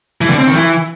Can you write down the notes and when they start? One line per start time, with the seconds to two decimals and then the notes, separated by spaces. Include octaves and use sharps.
0.21 E3
0.30 D3
0.38 C4
0.47 D#3
0.56 E3